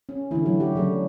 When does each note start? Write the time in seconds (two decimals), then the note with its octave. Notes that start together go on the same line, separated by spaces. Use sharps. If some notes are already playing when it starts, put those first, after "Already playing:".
0.09 C#4
0.31 D3 E3 A3 E4
0.46 F#3 F#4
0.60 G3 G4
0.75 C#3 F#3 A3